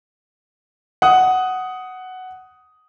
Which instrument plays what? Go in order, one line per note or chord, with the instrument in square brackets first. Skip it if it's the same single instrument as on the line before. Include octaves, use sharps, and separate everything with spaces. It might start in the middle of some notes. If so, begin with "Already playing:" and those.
[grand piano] F#5 D#6